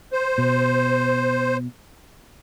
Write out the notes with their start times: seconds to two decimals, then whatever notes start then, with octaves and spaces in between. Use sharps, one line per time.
0.13 C5
0.38 B2